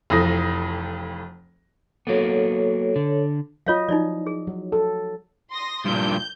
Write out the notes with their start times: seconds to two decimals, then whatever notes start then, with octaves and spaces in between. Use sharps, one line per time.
0.10 F1 F2 E3 D#6 A#6
2.07 F#3 A#3 B3 A4 C#5
2.96 D3
3.67 F#3 F4 C#5 D#5 F5
3.89 F3 D#4 E4 D5 D#5
4.27 G#4
4.47 F#3
4.72 A4
5.51 C6 D#6 A#6
5.85 G2 A#2 G6